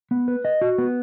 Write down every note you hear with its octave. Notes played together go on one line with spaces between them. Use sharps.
B3
B4
D#5
F#4
B3